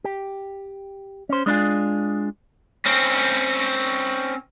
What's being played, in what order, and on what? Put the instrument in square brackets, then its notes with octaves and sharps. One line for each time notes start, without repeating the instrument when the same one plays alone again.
[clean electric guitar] G4
C#4 C5
G#3 D4 E4 F4 G#4
[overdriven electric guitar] C4 C#4